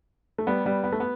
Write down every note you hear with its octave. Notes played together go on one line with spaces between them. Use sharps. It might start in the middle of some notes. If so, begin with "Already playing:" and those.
A3
G3 B3
G3 B3
B3
A3
B3